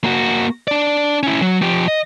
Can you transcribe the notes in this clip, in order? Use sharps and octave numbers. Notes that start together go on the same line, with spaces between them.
A#3 F#4
D4 D5
C#4 E4
F#3
F3 G4
D#5